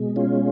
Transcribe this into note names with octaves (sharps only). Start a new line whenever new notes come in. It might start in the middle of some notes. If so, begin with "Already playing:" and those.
Already playing: B2 G#3
C#4 F4